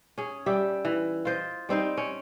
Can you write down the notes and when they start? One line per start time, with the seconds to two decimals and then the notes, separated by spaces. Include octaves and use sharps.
0.18 C#4 G#4
0.46 G3 G4 E5
0.85 E3
1.25 F4 C5 D#5
1.69 G3 C4 D#4 C5
1.97 C#4